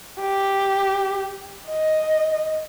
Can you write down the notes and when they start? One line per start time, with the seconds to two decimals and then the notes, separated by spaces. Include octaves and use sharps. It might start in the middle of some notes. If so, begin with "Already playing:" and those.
0.21 G4
1.68 D#5